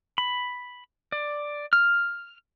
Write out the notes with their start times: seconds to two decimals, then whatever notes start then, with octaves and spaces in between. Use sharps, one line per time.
0.18 B5
1.12 D5
1.73 F6